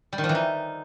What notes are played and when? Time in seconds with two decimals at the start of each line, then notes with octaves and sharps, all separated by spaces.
0.13 G3
0.18 D#3
0.24 F3
0.29 E3
0.35 D#4